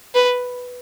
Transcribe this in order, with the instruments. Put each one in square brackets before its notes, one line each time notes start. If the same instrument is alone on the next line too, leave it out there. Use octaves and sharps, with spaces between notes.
[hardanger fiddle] B4